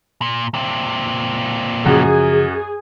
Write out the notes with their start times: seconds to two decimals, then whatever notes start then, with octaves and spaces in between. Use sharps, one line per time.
0.22 A#2
0.54 A#2 C4
1.86 F#2 C#3 F3 F#4 G#4